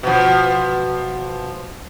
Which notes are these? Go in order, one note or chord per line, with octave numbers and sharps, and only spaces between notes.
B2 F3